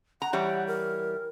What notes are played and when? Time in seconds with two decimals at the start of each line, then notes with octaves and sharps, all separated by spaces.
0.22 F#5 A#5
0.33 E3 G3 C#5
0.67 A#4